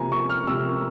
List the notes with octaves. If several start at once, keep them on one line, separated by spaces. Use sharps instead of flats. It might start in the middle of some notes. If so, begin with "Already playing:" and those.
Already playing: C3 F3 A#3 G#5 A#5
C#6
F6
C3 F3 A#3 E6